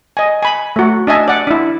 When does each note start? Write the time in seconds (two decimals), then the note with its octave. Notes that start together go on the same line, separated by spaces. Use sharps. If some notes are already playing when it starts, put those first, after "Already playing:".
0.17 D#5 G#5
0.43 G#5 B5
0.76 A3 F#4
1.07 D4 D#5 E5 G#5 A5
1.28 D5 F#5
1.47 D4 E4